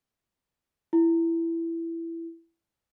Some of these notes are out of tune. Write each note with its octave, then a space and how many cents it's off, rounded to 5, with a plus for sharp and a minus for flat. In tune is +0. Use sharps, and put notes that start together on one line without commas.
E4 +15